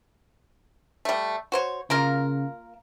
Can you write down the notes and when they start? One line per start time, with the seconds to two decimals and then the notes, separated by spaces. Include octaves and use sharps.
1.05 G3 A3
1.52 F#4 C5 C#5
1.90 C#3 A#3 F4 A#4